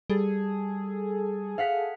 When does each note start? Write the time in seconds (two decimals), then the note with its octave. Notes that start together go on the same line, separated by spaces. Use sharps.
0.10 G3 G#4 A4
1.58 F5 F#5 B6